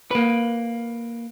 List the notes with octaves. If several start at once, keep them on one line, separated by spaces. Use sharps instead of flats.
A#3 B4